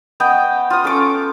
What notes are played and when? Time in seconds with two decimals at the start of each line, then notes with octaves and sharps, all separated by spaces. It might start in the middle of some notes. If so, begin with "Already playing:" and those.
0.20 B3 D#5 G5
0.70 F4 D#6
0.84 C#4 A4 C#6 D6